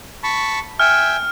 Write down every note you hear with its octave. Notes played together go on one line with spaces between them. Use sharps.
A5 B5 C#6
E5 G5 G#5 F6